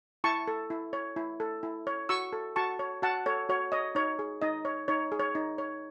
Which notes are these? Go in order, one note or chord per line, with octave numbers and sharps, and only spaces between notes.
E4 A5 C#6
A4
E4
C#5
E4
A4
E4
C#5
F#4 C#6 E6
A4
F#4 A5 C#6
C#5
F#4 F#5 A5
A4 C#5
F#4 C#5
C#5 D#5
D#4 C#5
G#4
D#4 D#5
C#5
D#4 C#5
G#4
C#5
D#4
C#5